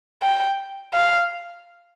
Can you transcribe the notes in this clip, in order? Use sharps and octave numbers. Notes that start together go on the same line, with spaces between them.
G5
F5